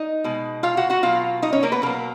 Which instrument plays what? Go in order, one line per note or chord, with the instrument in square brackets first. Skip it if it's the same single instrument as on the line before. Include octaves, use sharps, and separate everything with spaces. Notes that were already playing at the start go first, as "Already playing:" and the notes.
Already playing: [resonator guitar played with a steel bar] D#4 D#5
B2 G#3
F4 F5
F#4 F#5
F#4 F#5
B2 F#3 F4 F5
D#4 D#5
C#4 C#5
A#3 A#4
B3 B4
B2 F#3 A#3 A#4